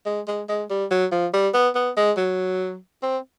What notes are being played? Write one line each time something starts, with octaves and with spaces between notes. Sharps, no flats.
G#3
G#3
G#3
G3
F#3
F3
G3
B3
B3
G#3
F#3
C4